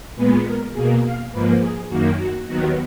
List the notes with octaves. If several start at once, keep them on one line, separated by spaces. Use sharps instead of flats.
A#2 G#3 B3 B4
A#4
B2 A#3 G#4
F5
G#2 F3 A#3 B4
G#4
F#2 D#3 A#3 F#4
F#4
D#2 D#3 F#3 B3 F#4